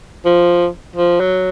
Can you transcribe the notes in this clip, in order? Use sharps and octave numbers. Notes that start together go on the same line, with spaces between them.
F3
F3
F#3